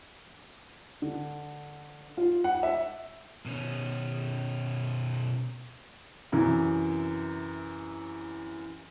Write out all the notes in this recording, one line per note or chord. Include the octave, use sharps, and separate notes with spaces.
D3
F4
F#5
E5
B2 C#4
F#2 C3 E3